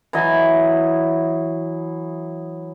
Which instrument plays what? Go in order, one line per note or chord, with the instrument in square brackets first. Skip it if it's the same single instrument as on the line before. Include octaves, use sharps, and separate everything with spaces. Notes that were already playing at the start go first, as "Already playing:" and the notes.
[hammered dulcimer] E3 F#3 D#5